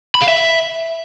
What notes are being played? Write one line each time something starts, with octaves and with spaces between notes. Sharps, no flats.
B5
F5
E5